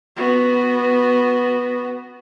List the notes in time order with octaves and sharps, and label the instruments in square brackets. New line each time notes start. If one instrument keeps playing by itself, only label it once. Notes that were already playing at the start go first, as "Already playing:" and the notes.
[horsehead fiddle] B3 F#4